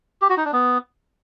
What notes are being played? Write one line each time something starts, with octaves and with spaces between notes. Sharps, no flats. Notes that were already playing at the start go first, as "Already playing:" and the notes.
G4
F#4
D#4
D4
B3